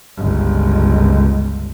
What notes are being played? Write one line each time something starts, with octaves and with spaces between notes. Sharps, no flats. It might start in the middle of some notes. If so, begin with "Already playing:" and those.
G1 C#2